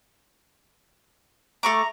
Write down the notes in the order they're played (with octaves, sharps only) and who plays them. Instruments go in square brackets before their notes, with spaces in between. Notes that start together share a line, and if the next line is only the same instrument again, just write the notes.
[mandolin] A3 C#6 D6 [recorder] A#5